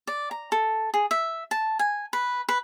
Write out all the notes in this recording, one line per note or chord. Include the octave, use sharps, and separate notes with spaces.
D5
A#5
A4
G#4
E5
A5
G#5
B4
B4